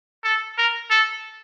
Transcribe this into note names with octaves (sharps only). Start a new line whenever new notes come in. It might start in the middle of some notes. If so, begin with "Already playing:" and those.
A4
A#4
A4